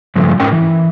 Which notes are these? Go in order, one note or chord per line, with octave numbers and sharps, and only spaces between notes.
G2 C#3 F3 A3
G#2 C#4 A#4 G5
E3